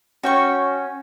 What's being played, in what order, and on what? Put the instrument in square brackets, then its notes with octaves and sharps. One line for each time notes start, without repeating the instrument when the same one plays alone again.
[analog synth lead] C#4 [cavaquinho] F#4 G5 C#6